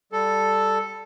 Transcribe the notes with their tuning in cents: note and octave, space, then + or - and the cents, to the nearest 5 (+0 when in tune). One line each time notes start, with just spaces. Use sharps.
G3 +0 A4 +0